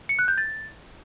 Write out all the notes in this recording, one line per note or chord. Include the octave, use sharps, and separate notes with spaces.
C#7
F#6
G6
A6